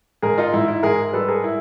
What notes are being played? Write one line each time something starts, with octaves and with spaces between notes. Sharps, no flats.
G#2 G#4 A#4
D#4 F4
G#2 E4
E4
G#2 G#4 A#4
G3 A4 B4
G#4 A#4
E4